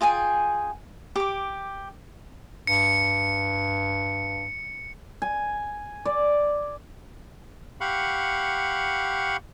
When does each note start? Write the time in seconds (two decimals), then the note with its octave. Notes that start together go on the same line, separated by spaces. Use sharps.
0.01 F4 G#4 G5 G#5
1.16 G4 D6
2.67 G2 C#7
5.22 G#5
6.05 D5
7.81 G4 F5 F#5 B5 C#6